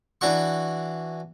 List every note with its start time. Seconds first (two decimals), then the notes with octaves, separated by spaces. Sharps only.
0.21 E3 D4 F#4 C#6